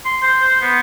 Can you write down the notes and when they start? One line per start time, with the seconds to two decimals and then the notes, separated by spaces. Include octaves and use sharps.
0.05 C6
0.22 C5
0.41 C5
0.61 B3